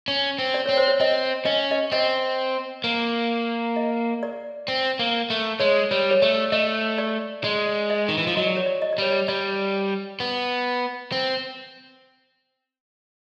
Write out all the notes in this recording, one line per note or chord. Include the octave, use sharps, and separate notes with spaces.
C#4
C4
D5
C4 C#5
C5
C#5
C4 D#5
C#4 D#5
D#5
C4 D#5
A#3
D#5
D5
C4
A#3
A3
G#3 C#5
G3 C#5
C#5
A3 D5
A3 D#5
D5
G#3 D5
D#5
D#3
E3
F3
F#3 D#5
D5
C#5
D5
D#5
D5
G3 C#5
D5
G3 D5
B3
C4